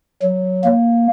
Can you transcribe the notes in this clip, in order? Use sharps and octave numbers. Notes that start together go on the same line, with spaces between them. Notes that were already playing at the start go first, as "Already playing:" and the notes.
F#3
A#3